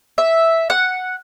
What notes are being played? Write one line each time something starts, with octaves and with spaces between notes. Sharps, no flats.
E5
F#5